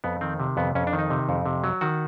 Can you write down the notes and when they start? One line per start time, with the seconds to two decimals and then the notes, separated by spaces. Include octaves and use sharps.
0.04 F2 B3
0.21 D#3 C4
0.40 C3
0.57 F2 B3
0.75 F2 C#4
0.87 D4
0.93 D#3
0.98 D#4
1.10 C3
1.29 F2
1.46 C3
1.64 F#3
1.81 D#3 F#4